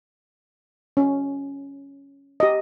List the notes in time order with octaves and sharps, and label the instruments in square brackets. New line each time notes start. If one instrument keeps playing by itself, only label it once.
[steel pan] C#4
G4 D#5